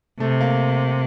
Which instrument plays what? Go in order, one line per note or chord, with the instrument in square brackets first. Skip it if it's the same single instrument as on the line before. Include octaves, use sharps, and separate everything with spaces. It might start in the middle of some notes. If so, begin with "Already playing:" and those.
[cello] C3 [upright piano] A3
[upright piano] A#3